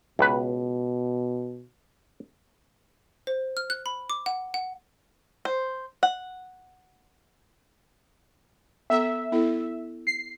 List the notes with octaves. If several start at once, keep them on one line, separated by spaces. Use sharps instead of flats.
C#2 B2 B4
C5
F6
F#6
B5
D6
F#5
F#5
C5
F#5
B3 A4 E5 A#5
B3 E4 A4
C7